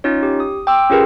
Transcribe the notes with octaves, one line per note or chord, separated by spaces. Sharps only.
C#4 D#4 F4 C#5
G4
D#6
G5 C6 D6 E6
C#4 F4 G4 G#4 A#4 B4